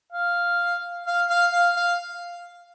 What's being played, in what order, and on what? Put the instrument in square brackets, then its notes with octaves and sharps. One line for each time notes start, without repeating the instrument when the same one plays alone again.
[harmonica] F5
F5
F5
F5
F5